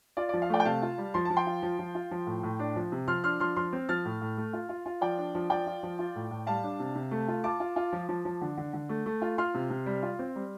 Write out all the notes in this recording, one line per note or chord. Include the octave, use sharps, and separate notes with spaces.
F4 D5
F3 D5
F5
A3 D5 G5
G5
C3 F5 A5
F4
G3
F3 C6
F3 A5
G5 C6
F4
F3
F3
F4
F3
A2
A2
D4
F3
C3
F3 C6 F6
D4 C6 F6
F3 C6 F6
F3 C6 F6
C4
F3 F6 A6
A2
A2
A3
F4
F4
F4
F3 D5 G5
D4
F3
F3 D5 G5
F4
F3
F4
A2
A2
G3 F5 A5
D4
C3
C3
A3
F4
F4 A5 D6
F4
F4
F3
F3
F3
D3
D3
D3
A3
A3
F4
F4 C6 F6
C3
C3
G3
F4
C4
G3